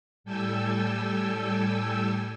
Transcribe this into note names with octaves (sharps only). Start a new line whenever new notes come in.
A2 G3 A4 G5 G#5 E6